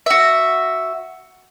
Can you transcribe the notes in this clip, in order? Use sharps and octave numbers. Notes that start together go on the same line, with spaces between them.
F#4 E5